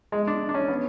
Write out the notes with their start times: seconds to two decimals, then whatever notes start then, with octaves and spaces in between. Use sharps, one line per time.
0.12 G#3
0.27 D4
0.49 D4
0.54 C#4
0.68 B3